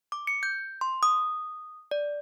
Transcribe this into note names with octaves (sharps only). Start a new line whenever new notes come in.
D6
C#7
G6
C6
D#6
D5